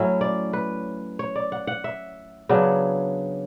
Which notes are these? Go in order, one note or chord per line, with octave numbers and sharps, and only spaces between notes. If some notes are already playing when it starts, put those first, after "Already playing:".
Already playing: A2 F#3 C#4 E4 E5
D5
B4
C#5
D5
F#5
F#5
E5
C#3 F#3 B3 D4